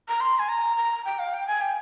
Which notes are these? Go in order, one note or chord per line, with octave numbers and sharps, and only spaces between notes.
A#5
C6
G#5
A#5
A#5
G5
F5
G5
G#5
G5